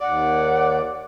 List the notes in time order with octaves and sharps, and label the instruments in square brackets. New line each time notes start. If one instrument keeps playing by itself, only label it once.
[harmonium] D#2 [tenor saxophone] D5 [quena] F#5